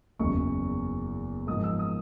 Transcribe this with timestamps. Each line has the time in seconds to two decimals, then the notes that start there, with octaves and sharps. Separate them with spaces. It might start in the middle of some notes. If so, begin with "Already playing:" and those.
0.19 F#1 E2 C#3 F#3 C#6
1.47 G#2 F3 A#3 D#6
1.64 E6
1.79 D#6